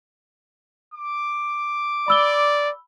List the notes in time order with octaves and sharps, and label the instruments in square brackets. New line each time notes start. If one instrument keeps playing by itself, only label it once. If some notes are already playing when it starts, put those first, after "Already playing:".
[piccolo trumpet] D6
[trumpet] D5 [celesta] B5 E6 G7